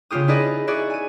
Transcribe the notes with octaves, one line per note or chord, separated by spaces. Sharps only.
C#3 B3 F4 G4 D#6
D#4 E4 G#4 B4 D5 D#5
E4 F#4 G#4 D5
G#5 D#7